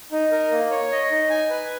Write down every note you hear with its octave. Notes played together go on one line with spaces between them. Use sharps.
D#4
A#4
A#3
C#5
D#5
D#4
G#5
B4